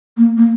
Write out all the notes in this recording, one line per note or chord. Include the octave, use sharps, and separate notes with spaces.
A#3
A#3